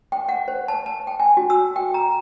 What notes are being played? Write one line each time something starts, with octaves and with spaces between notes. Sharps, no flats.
G5
F#5
C5
A5
A5
G5
G#5
F#4
E6
G5
A#5